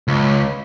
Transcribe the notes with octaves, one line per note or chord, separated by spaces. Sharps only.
C#2